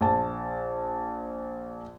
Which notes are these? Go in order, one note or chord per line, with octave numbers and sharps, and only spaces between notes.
A#1 A5